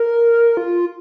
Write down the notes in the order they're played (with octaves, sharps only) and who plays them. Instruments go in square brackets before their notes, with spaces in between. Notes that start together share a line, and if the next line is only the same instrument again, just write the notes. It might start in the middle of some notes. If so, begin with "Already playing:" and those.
Already playing: [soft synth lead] A#4
F4